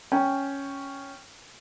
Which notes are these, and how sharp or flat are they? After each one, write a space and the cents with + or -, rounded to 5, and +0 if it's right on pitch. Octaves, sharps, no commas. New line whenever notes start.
C#4 +0 G5 +0